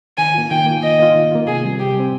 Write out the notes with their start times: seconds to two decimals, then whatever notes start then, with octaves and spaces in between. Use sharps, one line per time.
0.18 D#3 G#5
0.34 A#3 F4
0.51 D#3 G5
0.66 A#3 F4
0.83 D#3 D#5
0.99 A#3 F4
1.15 D#3
1.31 A#3 F4
1.47 C3 G#4
1.63 G3 C4
1.79 C3 G4
1.95 G3 C4